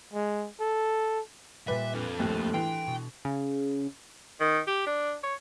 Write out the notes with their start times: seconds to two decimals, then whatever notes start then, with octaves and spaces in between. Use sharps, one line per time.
0.13 G#3
0.60 A4
1.68 A#2 G3 B4 E5
1.94 F2 D4 A4 F6
2.19 A#1 D#2 A2 A5 F#6
2.54 E3 G5 C6
2.87 B2
3.25 C#3
4.40 D#3
4.67 G4
4.87 D4
5.23 C#5